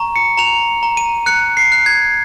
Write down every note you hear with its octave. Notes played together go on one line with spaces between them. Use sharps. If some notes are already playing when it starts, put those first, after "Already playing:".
Already playing: A#5 C#6
C#7
A#5 F7
A#5
D#7
F#6 C#7
C7
F#6
G#6